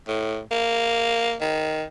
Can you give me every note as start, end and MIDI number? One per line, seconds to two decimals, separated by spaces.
0.08 0.40 45
0.51 1.36 58
1.41 1.84 51